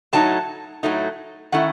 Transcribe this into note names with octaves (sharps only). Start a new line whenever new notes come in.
A2 F#3 A3 D#4 A5
A2 F#3 A3 D#4
D#3 A3 C#4 E4 F#5